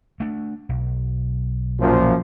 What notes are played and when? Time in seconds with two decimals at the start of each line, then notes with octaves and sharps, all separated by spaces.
0.20 A3 D4
0.69 B1
1.81 F#2 A#2 F3